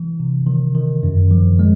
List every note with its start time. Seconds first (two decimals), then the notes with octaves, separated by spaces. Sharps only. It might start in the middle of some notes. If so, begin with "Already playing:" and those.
Already playing: E3
0.20 C3
0.47 D#3
0.75 D#3
1.03 F#2
1.31 F3
1.59 G#3